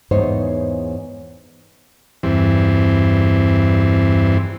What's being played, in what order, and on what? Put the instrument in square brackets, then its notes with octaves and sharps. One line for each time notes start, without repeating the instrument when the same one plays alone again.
[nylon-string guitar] E2 G#2 B3 D#4 C5 C#5
[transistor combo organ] E2 G2 E3 C4